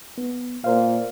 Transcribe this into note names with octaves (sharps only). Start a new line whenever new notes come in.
B3
A#2 A#4 C5 F5